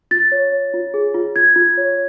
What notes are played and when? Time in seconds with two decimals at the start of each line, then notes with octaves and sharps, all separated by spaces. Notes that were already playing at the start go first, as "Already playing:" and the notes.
0.11 F4 A6
0.32 C#5
0.52 C#5
0.74 F4
0.94 G#4
1.14 F4
1.36 F4 G#6
1.56 F4
1.77 C#5